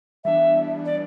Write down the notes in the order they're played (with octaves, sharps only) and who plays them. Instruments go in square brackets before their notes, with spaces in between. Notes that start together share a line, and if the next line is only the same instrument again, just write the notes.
[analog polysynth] E3 G3 B3 D4 [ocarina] E5
[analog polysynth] E3 G3 B3 D4 [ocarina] D5